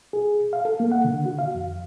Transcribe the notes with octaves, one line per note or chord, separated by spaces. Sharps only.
G#4
F5
A4
A#3
F#5
D3
F#4
F5
F2